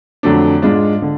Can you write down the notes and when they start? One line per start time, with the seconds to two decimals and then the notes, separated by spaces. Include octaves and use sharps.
0.23 F2 D3 F#3 A3 D4
0.62 G#2 G#3 D4 F4
1.02 D3